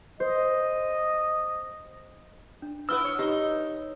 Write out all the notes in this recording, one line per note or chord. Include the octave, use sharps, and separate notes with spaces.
C5 D#5
D4
B3 E4 B4 E6 F6 G7
C#5
D#4 G4 G7